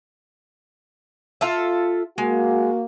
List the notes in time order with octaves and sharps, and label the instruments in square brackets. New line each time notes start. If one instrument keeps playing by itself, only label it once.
[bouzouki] F4 A4 E5
[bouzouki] G#3 [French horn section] A#3 F#4